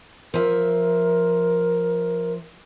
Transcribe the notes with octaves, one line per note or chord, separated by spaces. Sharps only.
F3 A#4 E5